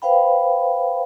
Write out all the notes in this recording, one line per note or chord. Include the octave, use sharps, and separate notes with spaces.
B4 C5 F5 G5 B5